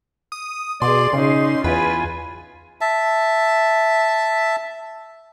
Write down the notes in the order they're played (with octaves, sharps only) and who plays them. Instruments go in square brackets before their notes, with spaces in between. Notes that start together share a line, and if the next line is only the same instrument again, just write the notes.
[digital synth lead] D#6
[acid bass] B2 [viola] G#4 D5 [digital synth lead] C6
[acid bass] C#3 [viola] C#4 D#4
[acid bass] E2 [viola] F4 G#5 [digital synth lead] B4
[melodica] E5 A5